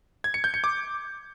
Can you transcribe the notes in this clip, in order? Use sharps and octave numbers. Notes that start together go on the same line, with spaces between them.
G#6
C#7
G6
C#7
D6